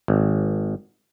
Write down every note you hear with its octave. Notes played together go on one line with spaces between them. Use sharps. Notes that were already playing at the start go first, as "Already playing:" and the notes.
G#1